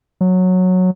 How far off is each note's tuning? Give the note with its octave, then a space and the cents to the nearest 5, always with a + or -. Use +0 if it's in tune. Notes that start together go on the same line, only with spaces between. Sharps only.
F#3 -10